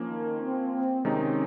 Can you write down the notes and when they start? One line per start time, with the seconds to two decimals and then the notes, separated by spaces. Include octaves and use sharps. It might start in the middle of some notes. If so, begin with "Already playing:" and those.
Already playing: F3 A#3 C#4
0.09 D#3
0.41 C4
0.73 C4
1.05 C3 D#3 G#3 C#4 D#4